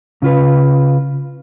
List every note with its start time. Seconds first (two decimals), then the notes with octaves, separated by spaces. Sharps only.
0.22 C#3 F4 B4